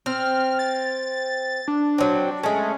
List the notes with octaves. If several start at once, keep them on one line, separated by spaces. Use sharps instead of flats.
C4 F6
A6
D4
F#3 C4
G#3 A3 C#4